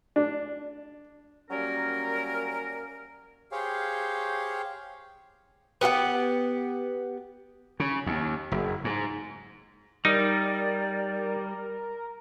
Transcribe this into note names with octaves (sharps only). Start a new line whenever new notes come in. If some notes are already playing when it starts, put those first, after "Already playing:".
D4
F#3 G3 A#3 C#4 A#4
G4 G#4 C5 C#5 F5 G5
B3 G4 G#4 F#5
C#3
D#2
F#1
G#2
G3 D#4 A#4 D5